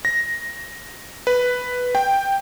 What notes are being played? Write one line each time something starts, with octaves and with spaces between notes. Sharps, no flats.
A#6
B4
G5